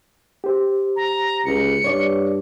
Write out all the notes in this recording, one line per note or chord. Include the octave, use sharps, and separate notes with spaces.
G4 C5
A#5
C#2 C#7
G2 C#5 D5